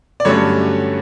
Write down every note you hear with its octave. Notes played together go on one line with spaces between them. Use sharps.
D5
G2 D3 F#3 A3 C#4 C#5